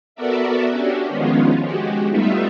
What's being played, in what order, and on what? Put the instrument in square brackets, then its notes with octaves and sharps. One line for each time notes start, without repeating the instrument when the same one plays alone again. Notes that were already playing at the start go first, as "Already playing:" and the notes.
[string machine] B3 F#4 A4 A#4 D5 E5
C#4 D4 F#4 G4
D#3 F3 G#3 B3 C#4 F4
G#3 F#4 G4
G3 A3 B3 D#4 F4 E5